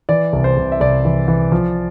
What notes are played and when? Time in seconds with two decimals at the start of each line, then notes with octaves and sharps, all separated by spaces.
0.09 E3 D5
0.33 C2
0.44 C5
0.57 C2
0.72 E5
0.80 C2 D5
1.05 E3
1.28 E3
1.52 F3